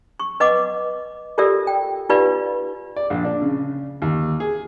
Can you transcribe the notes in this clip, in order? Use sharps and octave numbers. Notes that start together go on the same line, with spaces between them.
C#6
B4 D#5 F#5 D6
F4 G4 A4 A#4 D5 E5
G5
D#4 F4 G4 B4 D5 F5
D5
A#1
D4
C#3
D#2
G#4